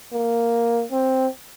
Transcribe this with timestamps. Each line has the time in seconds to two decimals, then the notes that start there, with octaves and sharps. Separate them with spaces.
0.13 A#3
0.91 C4